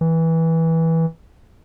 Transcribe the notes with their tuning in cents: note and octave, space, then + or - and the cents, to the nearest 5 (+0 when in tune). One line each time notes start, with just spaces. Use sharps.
E3 -15